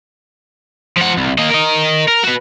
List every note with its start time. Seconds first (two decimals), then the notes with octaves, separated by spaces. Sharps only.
0.97 F3 F#5
1.17 C2
1.38 A#3 D#5
1.50 A#4 D#5
2.08 A#4
2.23 F#4 B4